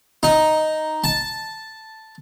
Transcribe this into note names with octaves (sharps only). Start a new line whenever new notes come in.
D#4
A5